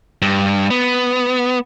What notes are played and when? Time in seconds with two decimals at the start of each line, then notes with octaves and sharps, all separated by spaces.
0.22 G2
0.70 B3